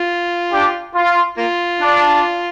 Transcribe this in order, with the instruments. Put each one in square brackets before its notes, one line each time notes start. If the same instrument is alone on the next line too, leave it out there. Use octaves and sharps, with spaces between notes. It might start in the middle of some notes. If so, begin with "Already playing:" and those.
Already playing: [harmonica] F4
[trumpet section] D4 G4
F4
[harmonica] A#3 F4
[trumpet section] D4